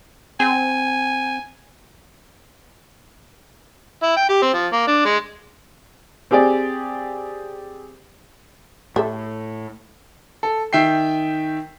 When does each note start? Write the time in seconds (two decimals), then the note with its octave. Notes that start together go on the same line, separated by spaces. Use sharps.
0.40 C4 G#5
4.03 E4
4.16 G5
4.30 G4
4.42 C4
4.54 F3
4.73 A#3
4.87 D4
5.05 G#3
6.31 C4 G4 G#4 D5
8.96 A2 G4 A4 E5
10.43 A4
10.73 D#3 E5 G5 C7